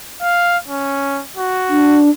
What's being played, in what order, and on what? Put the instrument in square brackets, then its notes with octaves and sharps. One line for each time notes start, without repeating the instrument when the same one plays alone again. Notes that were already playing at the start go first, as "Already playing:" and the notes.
[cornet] F5
C#4
F#4
[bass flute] D4